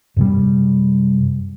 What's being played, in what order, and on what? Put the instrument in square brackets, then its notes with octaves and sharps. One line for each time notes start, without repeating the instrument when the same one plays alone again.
[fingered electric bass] F#2 C3 G3